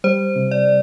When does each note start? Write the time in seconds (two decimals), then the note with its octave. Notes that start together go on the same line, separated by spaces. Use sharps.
0.04 G3 C5
0.36 C3
0.51 D5